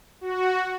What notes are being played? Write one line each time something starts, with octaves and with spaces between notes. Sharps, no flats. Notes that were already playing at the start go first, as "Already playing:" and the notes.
F#4